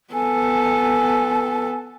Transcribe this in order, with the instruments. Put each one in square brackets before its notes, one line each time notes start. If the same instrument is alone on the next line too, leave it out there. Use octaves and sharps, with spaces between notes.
[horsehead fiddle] B3 A4 [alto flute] G#5